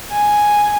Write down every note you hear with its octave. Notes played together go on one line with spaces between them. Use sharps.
G#5